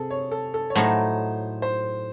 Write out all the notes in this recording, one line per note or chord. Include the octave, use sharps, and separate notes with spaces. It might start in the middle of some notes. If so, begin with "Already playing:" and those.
Already playing: C3 G#4 A4
C#5
A4
A4
C#5
A2 F#3 A3 D#4 C5
C5